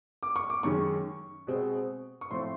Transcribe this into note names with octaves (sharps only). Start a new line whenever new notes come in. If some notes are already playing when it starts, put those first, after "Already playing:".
D6
C#6
D6
F#2 D#3 G#3 C#4 C#6
B2 G#3 C4
C#6
A2 F3 A3 C4 C6